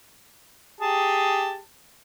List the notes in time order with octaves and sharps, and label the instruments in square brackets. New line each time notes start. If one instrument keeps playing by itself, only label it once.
[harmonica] G4 G#4 A5